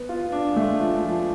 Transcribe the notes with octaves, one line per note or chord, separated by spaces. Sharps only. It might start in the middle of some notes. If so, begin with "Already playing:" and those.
Already playing: B3
F4
D4
G#3
A3
F3
F3